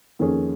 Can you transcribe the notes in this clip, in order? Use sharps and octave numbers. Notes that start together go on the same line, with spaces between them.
F2 D#3 A#3 C#4 G#4